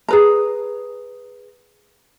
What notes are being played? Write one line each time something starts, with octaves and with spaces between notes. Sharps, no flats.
G#4 B4 A#5